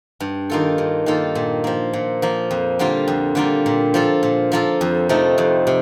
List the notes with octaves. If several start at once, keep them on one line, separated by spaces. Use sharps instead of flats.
G2
D#3 A#3 F4 A4
G2
D#3 A#3 F4 A4
A#2
F3 A#3
A#2
F3 A#3
F2
D3 G3 A#3 F4
F2
D3 G3 A#3 F4
A#2
F3 A#3 F4 A4
A#2
F3 A#3 F4 A4
F2
C3 F3 A3 D#4
F2
C3